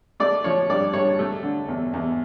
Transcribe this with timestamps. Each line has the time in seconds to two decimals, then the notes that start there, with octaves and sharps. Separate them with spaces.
0.20 A3 D5
0.44 F3 C#5
0.69 G2 D5
0.93 G2 C#5
1.19 A3
1.43 D3
1.68 E2
1.93 E2